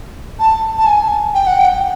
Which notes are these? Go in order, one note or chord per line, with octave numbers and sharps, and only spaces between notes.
A5
A5
G#5
G5
F#5
G5